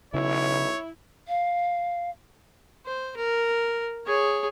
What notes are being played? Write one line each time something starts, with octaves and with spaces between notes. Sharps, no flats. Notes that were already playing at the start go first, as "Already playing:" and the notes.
B1 C#3 E4 C#5
F5
C5
A#4
G#4 C#5